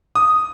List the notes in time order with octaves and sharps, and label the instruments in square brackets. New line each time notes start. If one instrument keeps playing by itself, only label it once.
[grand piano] D#6